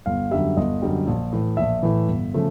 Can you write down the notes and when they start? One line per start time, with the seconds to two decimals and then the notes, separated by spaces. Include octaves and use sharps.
0.06 G1 F5
0.31 F#2 D3 G3 E5
0.57 G1 D#5
0.82 F#2 D3 G3
1.07 A#1
1.32 A2 E3
1.57 A#1 E5
1.83 A2 E3
2.08 G1
2.34 C#3 F3 A3